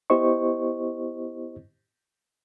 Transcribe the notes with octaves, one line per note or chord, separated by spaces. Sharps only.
B3 E4 G4 C5 D#5 C#6